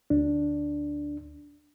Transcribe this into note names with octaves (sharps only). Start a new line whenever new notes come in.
D2 D4